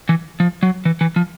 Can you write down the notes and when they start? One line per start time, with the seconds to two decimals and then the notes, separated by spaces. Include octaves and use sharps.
0.09 E3
0.40 F3
0.63 F#3
0.85 E3
1.01 E3
1.16 F3